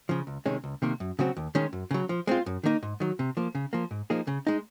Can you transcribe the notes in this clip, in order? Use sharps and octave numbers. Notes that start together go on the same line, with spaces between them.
C#3 F3
C#2
C3 D#3 G#3 C#4
C#2
C3 D#3 A#3
F#2
C#3 F#3 C4 F#4
D#2
D#3 G#3 C#4
F#2
C#3 F#3
F3
G#3 C4 F4
F#2
D#3 A#3 D#4
G#2
D#3 F#3
C3
F3 A#3
C#3
F3 A#3
G#2
F3 A#3 D#4 G#4
C#3
G#3 D#4